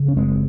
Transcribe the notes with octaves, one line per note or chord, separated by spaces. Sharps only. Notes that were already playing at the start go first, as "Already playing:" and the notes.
Already playing: C#3
C#4
F#1 G#3 C4